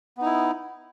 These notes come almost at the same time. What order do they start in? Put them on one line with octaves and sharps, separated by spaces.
B3 D#4 E4